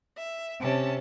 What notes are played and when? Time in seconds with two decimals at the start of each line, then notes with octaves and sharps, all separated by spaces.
0.16 E5
0.60 C3 C#4 A5